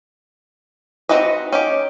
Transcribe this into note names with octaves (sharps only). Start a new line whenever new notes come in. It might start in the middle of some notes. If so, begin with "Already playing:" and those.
C4 D#4 F#4 B4 D#5
C#4 D#4 G4